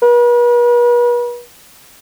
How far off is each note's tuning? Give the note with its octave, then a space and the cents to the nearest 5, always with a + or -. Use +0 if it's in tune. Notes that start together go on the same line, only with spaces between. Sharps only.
B4 -40